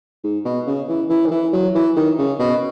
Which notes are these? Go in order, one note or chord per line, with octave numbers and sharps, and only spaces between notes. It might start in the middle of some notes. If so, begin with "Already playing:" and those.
G#2
B2
C#3
E3
E3
D#3
E3
F#3
E3
D#3
C#3
B2